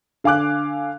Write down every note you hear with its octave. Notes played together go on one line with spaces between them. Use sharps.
D3 F5 G#5 D6 F#6